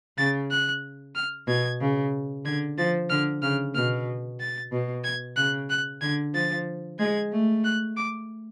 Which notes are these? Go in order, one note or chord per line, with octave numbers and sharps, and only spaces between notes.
C#3 A6
F#6
F6
B2 G#6
C#3
D3 G#6
F3 A6
D3 F6
C#3 F6
B2 F6
A6
B2
G#6
C#3 F#6
F#6
D3 G#6
F3 A6
G#3 G#6
A3
F#6
D6